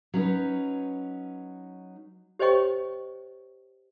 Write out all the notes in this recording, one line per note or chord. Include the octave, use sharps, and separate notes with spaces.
F#3 C#4 D#4 B4
G4 C5 C#5 D#5 G5 C#6